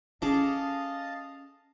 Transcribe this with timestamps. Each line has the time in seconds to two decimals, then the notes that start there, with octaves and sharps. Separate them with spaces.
0.22 C#4 G#4 A4 D#5 F5 A5 D6